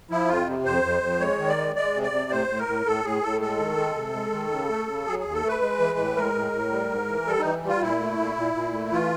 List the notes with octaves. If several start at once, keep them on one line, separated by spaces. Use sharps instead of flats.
F3 E4
F2 F4
C3
F2 C5
F2
F2
G#3 C#5
D#3
D5
G#3
G#3 D5
C3
D5
C3
A2 C5
A2
A#4
A2
A2 A4
A2 G#4
A2 A4
G#3 A4
D#3
G#3
C3
G#3
D#3
C#3
A3
C#3
F#3 G#4
D#2 G#4
A4
A3
B4
G#3
E3
A2
G#3 A#4
A2
A2
G3
G#2
E3
G3 A4
D#4
E3
G3 F4
A#2 E4
A3
A#2
A#2
A#2
A3
E3 F4